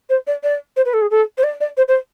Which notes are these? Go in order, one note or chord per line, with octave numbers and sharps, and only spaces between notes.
C5
D5
D5
C5
B4
A4
G#4
A4
C5
D5
D5
C5
C5